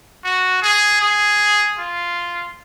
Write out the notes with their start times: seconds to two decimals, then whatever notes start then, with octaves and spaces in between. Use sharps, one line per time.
0.24 F#4
0.62 G#4
1.01 G#4
1.78 F4